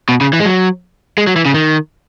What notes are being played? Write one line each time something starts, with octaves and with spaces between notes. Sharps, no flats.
B2
C#3
E3
G#3
F#3
G#3
F#3
E3
C#3
D#3